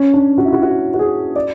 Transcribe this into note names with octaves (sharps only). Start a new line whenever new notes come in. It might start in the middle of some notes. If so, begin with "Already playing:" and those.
Already playing: C#4
D4
F#4
E4
F#4
F#4
F#4
G#4
D5